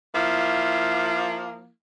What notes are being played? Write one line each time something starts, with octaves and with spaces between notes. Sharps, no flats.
F3 A#3 E4